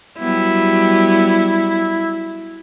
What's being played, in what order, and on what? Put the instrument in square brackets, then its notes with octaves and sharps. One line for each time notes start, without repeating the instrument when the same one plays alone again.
[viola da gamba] F#3 G3 B3 [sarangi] E4